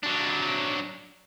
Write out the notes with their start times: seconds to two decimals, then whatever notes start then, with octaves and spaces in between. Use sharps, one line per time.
0.03 F#3 D4